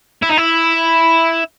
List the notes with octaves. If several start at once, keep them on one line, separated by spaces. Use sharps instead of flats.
E4
D#4
E4